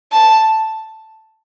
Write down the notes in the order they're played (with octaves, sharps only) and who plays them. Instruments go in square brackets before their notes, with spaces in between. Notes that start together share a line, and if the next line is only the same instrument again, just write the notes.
[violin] A5